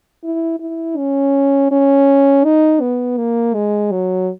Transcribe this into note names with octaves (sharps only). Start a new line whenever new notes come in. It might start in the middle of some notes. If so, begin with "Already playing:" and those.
E4
E4
C#4
C#4
D#4
B3
A#3
G#3
F#3